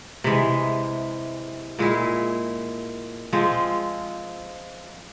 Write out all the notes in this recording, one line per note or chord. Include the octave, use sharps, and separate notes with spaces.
C3 E3 G#3
A#2 G#3 E4
F3 G#3 C4